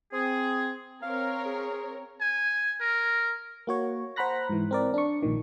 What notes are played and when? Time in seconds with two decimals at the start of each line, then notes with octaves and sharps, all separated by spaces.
0.12 C4 G#4
1.03 C4 A#4 C#5 F5
1.45 G#4
2.21 G#5
2.81 A#4
3.67 A#3 F#4 C#5
4.16 C5 F#5 A#5 B5 F#6 A#6
4.49 G#2 E3
4.71 C4 A#4 D5
4.94 D4 C#6
5.23 A#1 A#2 D#3